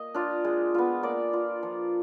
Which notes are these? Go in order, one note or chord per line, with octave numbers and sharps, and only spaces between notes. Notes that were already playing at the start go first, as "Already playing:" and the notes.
Already playing: A#3 D#5
D4 F4
G#3
B3 F4
A#3 D5
F4
F3